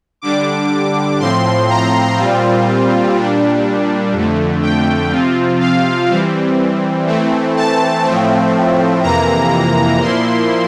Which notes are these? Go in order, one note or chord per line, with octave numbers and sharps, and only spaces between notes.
D3 G3 D4 D6
A2 F3 C4 C6
A#5
A#2 G3 C4 F4
A#2 G3 D4
F2 D3 A3
G5
C3 F3 C4 F4
F5
E3 G3 C4
E3 A3 C4
A5
A2 F3 A3 C4
F2 C3 E3 A#3 A#5
A#2 F3 A#3 E4 C6